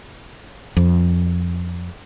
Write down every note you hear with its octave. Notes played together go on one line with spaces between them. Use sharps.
F2